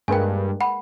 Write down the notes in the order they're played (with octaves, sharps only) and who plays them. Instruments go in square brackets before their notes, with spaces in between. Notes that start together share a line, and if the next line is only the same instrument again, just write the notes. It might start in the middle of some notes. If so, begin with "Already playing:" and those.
[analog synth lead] G2 [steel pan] G#3 A#3 B4 [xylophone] G5 G#5
[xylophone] F#5 B5